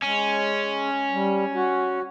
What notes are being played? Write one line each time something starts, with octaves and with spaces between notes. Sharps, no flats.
G#3 C#4
G3
F#4